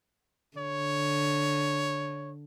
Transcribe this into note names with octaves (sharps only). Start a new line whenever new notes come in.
D3 C#5